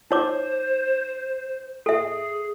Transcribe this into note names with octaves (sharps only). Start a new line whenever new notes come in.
D#4 C5 C#5 D6
G#4 A4 E5